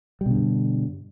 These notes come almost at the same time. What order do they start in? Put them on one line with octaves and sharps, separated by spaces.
G3 B2 D3 G2